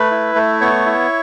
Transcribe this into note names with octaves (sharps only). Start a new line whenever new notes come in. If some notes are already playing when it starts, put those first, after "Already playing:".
Already playing: A3 B4
E4
A3
B3 C#5
E4